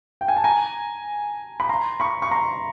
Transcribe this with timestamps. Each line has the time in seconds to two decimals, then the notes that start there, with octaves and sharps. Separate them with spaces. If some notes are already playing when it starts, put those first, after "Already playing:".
0.21 G5
0.28 G#5
0.37 A5
0.44 G#5 A#5
1.60 B5
1.69 A#5 C6
2.00 B5 C#6
2.22 C#6
2.31 A#5 C6